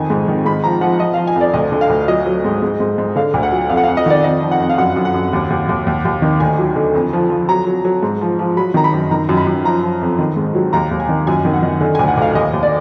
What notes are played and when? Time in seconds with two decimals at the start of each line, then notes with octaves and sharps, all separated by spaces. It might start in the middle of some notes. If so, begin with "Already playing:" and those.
Already playing: F2 D#3 G#5
0.10 G#2
0.28 D#3
0.45 G#2 B5
0.64 F3 A#5
0.81 F3 F#5
0.99 F3 D#5
1.14 F3 F5
1.27 G#5
1.36 F2
1.41 D5
1.53 D2 D#5
1.72 D3
1.81 F5
1.89 D2
2.08 F#3 D#5
2.26 F#3
2.45 G#2
2.63 G#2
2.80 G#2
2.98 G#2
3.16 D3 F5
3.34 D2
3.43 F#5
3.52 F#3
3.70 F2 F5
3.77 F#5
3.84 F2 F5
3.97 D#5
4.06 D#3 D5
4.24 F2 D#5
4.43 F3
4.51 F#5
4.60 F2
4.69 F5
4.78 F#2 F#5
4.96 F#2
5.05 F#5
5.14 F#2
5.33 D#2
5.50 D#2
5.69 D#2
5.87 D#2
6.05 D#2
6.22 D#3
6.40 D2 G#5
6.58 F#3
6.76 D3
6.94 F2
7.13 F3
7.30 F3
7.49 F#3 A#5
7.67 F#3
7.85 F#3
8.03 G#2
8.21 F3
8.39 F3
8.57 F#3 B5
8.74 D#3 A#5
8.84 B5
8.93 F#2
9.11 D#3 A#5
9.29 F#2
9.37 B5
9.47 F#2
9.64 F3 A#5
9.83 F3
10.01 F2
10.19 D#3
10.36 G#2
10.55 F#3
10.73 D#2 A#5
10.91 D#2
11.00 G#5
11.09 D#3
11.27 F#2 G#5
11.45 D#3
11.53 F#5
11.63 D#3
11.81 D3 G#5
11.95 D2 G#5
12.08 F#5
12.17 D2 F5
12.35 D#2 D#5
12.54 D#2
12.63 D5